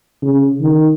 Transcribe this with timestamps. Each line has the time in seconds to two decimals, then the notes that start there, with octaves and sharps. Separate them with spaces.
0.22 C#3
0.61 D#3